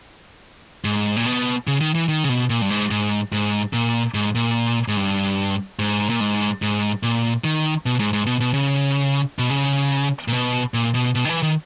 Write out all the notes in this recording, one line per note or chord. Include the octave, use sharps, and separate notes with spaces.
G#2
A#2
B2
C#3
D#3
E3
D#3
C#3
B2
A#2
G2
G#2
G#2
G#2
A#2
G#2
A#2
G#2
G2
G#2
A#2
G#2
G#2
A#2
D#3
B2
G#2
G#2
B2
B2
C#3
B2
C#3
A#2
B2
A#2
B2
B2
D#3
E3
D#3